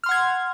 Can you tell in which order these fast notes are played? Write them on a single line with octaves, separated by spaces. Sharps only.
F6 C6 F#5 G#6